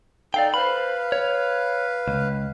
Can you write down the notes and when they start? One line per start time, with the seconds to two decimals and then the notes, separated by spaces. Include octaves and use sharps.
0.34 D#4 A4 D5 F5 G5
0.54 B4 C5 F5 B5
1.12 C#5
2.08 C#2